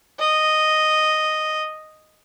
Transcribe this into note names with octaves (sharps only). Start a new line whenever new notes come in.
D#5